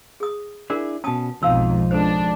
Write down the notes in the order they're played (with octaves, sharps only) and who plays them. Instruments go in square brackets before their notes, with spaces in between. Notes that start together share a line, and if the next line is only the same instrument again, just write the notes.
[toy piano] G#4 D#6
[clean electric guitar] D4 E4 G#4 [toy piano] A#4
[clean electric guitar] B2 C#4 [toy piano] A5 D#6
[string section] B1 F2 G#2 [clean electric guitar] F3 D#4 [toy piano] F5 E6
[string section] C#2 D4 [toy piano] A4 C5